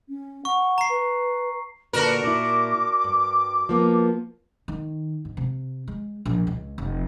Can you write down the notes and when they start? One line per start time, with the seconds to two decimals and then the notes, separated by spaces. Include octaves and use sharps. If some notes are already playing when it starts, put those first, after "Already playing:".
0.09 C#4
0.45 F#5 C#6
0.78 A#5 C7
0.89 B4
1.93 A#2 D3 D4 F#4 A#4 B4
2.24 A#2 E4 D6
3.04 G2
3.69 F3 A#3 B3
4.68 D#3
5.25 G#2
5.37 C3
5.88 G#3
6.26 A#1
6.47 C#2
6.78 F1